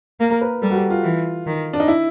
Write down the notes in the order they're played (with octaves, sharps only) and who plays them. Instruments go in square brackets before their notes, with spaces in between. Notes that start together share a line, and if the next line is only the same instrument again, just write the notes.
[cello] A#3 [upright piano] A#4
[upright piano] A#4
B4
[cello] G3 [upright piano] A4
[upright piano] F#4
G4
F4
[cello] E3
D#3
[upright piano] D4
D#4
E4